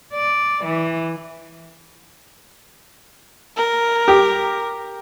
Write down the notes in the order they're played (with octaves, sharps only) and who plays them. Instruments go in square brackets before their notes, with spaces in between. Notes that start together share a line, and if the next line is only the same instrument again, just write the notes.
[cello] D5
E3
[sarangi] A#4
[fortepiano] G4